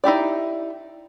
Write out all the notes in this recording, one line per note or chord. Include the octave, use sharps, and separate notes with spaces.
D#4 E4 G4 D5